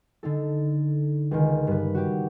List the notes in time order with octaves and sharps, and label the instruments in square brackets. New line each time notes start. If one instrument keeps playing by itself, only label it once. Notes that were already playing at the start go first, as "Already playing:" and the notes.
[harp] D3 D#4 A4
C#2 D#3
G2 B4
F#4 G4